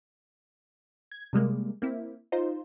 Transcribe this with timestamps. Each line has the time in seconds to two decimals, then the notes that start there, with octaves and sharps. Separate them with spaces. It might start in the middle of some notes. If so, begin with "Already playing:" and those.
1.12 G#6
1.33 C3 G3 G#3 A#3
1.82 A#3 C4 E4
2.32 D#4 F4 C5